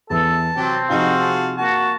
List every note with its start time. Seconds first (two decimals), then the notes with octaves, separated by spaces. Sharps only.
0.10 E2 E3 A4 A5
0.56 C3 F#3 C4 G4
0.90 C3 F3 D#4 F#4 G#4 F5 G6
1.21 A5
1.57 A#3 F#4 A5